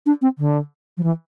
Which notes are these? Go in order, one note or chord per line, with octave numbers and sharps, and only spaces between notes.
D4
C4
D3
F3
E3